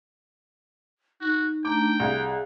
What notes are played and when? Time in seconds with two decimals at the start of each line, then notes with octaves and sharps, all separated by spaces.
1.21 D#4 F#4
1.65 A3 D4 G5 A#5 D6
2.00 C2 G#4 F5